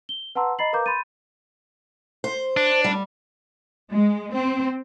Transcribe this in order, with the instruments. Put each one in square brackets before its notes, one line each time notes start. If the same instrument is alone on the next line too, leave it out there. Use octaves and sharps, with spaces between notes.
[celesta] G7
B4 F#5 A5 A#5 C6 E6
D#5 A#5 B5 A6 C7 F#7
A#4 B4 F5 A#5 D6 G6
B5 C6 G6 A6 D#7
[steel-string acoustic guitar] C5
[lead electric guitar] D4
[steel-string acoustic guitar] G3
[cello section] G#3
C4